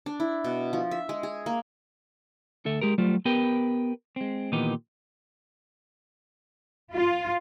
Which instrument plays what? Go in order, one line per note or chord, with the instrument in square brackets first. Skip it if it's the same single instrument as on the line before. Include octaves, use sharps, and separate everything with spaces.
[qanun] D4
E4
B2
F3
E5
G#3
G#4
A#3
[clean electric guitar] D2 A4 E5
G#3 G4 A#4
F#3 G3 A3 F4 C5
B3 G4 A#4 B4 G5
G#3 C4
A#2 D#3 E3 B3 D#4 G4
[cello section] F4